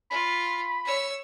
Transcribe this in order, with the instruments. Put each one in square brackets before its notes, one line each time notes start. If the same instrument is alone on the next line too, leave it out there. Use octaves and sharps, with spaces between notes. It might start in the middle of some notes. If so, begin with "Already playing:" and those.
[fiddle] F4 [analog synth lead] B5
[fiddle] C#5 E6